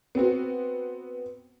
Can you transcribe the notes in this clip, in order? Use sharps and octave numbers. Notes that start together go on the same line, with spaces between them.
B3 C4 F#4